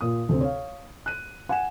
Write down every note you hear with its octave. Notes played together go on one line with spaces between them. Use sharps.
A#2 D#6
D2 C3 C4
C#5 F5
F#6 D#7
F#5 G#5 E7